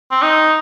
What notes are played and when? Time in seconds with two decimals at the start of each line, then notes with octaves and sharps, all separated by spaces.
0.11 C4
0.22 D#4